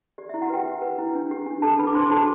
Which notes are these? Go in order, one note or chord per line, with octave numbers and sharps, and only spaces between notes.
G4 D5
E4 E5
F#4 F#5
G4 B4 G5
G4
B4
E4
D4
G4
D4
D4 A4 A5
D4 B4 B5
D6
D4 C5 C6
F#4 A4 A5